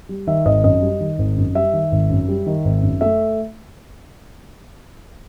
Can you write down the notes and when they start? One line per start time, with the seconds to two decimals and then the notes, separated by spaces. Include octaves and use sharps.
0.09 G3
0.27 D#3 E5
0.45 G#1 D#5
0.64 F#2 D#5
0.82 G3
1.00 D#3
1.19 G#1
1.37 F#2
1.55 G3 E5
1.73 D#3
1.92 G#1
2.10 F#2
2.28 G3
2.46 D#3
2.65 G#1
2.82 F#2
3.01 A3 E5